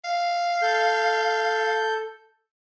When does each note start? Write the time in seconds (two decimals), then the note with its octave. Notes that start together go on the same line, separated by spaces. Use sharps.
0.04 F5
0.62 A4 G6